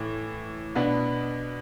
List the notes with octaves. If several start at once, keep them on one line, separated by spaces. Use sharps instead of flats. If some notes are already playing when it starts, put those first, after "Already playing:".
Already playing: A2 E3
B2 B3 D4